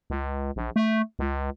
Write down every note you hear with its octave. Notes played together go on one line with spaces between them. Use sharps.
C#2
A#1
A3
C#2